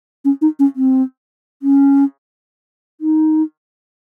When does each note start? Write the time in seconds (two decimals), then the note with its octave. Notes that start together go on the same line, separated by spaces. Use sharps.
0.25 C#4
0.42 D#4
0.59 C#4
0.76 C4
1.63 C#4
3.01 D#4